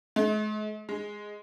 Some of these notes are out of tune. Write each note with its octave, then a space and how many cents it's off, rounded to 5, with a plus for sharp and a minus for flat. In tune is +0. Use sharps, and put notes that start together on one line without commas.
G#3 +45
G#3 +0